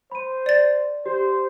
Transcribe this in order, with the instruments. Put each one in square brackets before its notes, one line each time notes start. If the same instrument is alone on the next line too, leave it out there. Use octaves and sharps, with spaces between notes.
[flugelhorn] C5 [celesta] B5 D#7
[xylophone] D5 A6
[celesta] G4 [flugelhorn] C5